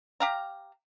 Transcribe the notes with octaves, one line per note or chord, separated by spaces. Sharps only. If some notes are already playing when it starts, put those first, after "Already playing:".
G4 F5 A#5